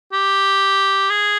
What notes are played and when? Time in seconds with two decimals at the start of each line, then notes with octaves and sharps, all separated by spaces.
0.13 G4
1.10 G#4